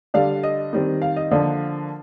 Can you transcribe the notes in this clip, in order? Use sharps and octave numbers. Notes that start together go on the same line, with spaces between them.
D3 G3 D4 F5
D#5
D#3 G3 C4
F5
D#5
D3 F3 A#3 D4 F5